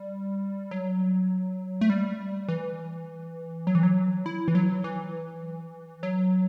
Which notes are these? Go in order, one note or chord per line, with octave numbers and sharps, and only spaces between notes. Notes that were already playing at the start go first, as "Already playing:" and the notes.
Already playing: G3
F#3
A3
G3
E3
F#3
E3
F#3
E4
E3
F#3
E3
F#3